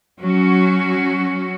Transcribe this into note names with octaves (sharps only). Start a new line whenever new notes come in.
F#3 C#4 F#4